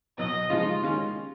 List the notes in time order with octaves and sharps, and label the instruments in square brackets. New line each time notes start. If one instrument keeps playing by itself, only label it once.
[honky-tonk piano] B2 F#3 B3 [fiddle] D#5
[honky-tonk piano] C#3 F3 G#3 D#4 [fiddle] F4
[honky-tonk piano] D#3 G#3 C#4